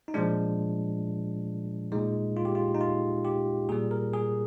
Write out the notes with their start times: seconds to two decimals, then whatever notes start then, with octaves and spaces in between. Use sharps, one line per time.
0.08 D#4
0.14 A#2 F3 G#3 D4
1.92 A#2 G#3 D#4
2.37 F4
2.45 G4
2.55 F4
2.74 D#4
2.81 F4
3.25 G4
3.69 A#2 G3 G#4
3.91 A#4
4.14 G#4